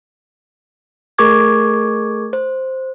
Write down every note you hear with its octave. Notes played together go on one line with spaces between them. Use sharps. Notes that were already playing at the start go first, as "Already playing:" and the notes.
A3 G#4 A#4 C#6 D6 G#6
C5